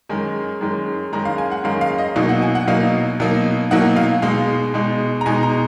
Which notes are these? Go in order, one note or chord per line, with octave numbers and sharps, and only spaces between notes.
F#2 D#3 G#3 G#5
F#2 D#3 G#3
F#2 D#3 G#3 A#5
F5
G#5
F#5
F#2 D#3 G#3 F5
F5
D#5
B2 F#3 A#3 D#4 F5
F#5
G#5
F#5
B2 F#3 A#3 D#4 F5
B2 F#3 A#3 D#4
B2 F#3 A#3 D#4 F#5
F5
B2 G#3 D#4 F5
B2 G#3 D#4
A#5
B2 G#3 D#4 G#5
A#5